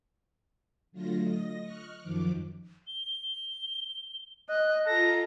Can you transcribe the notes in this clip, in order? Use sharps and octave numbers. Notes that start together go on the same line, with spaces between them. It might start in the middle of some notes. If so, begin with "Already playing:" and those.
D3 F#3 A3 F4 A#6
D#5 A#6
C#6 F6 F#6
F#2 D#3 F3 D6
G7
D#5 F#6
F4 A4 A#5 A#6